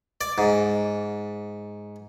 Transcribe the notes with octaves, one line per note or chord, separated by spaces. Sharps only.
D5
G#2